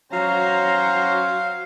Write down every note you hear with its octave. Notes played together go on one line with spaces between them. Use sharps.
F#3 C#4 F#4 C5 F5 A#5